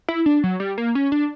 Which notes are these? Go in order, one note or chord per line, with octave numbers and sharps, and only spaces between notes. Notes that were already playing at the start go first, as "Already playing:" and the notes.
E4
D4
F#3
G3
A#3
C#4
D4